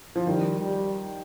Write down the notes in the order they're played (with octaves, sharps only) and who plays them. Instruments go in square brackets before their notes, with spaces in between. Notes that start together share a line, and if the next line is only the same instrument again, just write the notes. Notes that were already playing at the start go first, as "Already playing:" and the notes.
[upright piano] F3
[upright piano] D#3 [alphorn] G3
[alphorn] G3